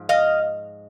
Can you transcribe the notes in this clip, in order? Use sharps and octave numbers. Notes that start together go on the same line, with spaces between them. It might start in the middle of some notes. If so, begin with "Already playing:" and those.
Already playing: G#2 F3
D#5 F5